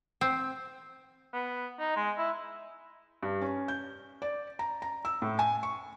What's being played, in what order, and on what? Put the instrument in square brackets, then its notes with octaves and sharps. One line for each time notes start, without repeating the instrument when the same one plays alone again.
[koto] C4
[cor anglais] B3
D#4
G#3
E4
[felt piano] G2
C#4
G6
D5
A#5
A#5
E6
A2
G#5
C#6